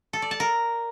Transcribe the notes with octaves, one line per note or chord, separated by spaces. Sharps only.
A4
D5
A5
A#4